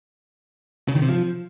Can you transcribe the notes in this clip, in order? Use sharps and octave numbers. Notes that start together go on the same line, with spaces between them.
C#3
D#3
C3
F3